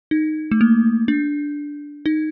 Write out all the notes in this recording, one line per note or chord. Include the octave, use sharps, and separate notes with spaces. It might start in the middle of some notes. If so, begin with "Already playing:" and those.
D#4
A3
A#3
D4
D#4